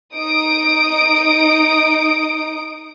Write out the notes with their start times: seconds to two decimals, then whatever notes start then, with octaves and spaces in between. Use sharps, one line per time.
0.14 D#4 D#6 D7